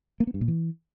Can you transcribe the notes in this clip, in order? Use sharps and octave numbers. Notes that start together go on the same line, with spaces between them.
A#3
B3
G2
A#2
E3